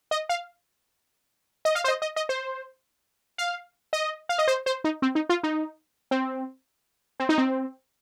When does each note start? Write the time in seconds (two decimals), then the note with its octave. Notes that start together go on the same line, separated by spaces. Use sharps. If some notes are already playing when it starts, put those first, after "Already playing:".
0.11 D#5
0.29 F5
1.65 D#5
1.75 F5
1.84 C5
1.88 D#5
2.02 D#5
2.16 D#5
2.29 C5
3.38 F5
3.93 D#5
4.29 F5
4.38 D#5
4.48 C5
4.66 C5
4.84 D#4
5.02 C4
5.15 D#4
5.29 F4
5.43 D#4
6.11 C4
7.20 C4
7.29 D#4
7.38 C4